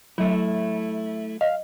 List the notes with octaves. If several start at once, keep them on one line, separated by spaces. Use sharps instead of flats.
F#3 A3 E4
D#5 F5